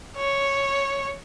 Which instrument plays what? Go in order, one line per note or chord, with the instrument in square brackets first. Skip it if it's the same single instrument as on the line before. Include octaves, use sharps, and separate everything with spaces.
[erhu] C#5